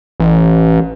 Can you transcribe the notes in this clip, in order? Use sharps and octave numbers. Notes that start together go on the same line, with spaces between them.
A1